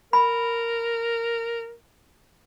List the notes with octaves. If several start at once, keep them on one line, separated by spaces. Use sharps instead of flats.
A#4 B5